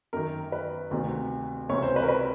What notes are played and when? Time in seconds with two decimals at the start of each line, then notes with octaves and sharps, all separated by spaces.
0.13 F#2 D#3 A#4
0.52 B4
0.91 D2 C3 D#3
1.69 C#2 C3 E3 C#5
1.82 C5
1.96 B4
2.03 A#4
2.08 B4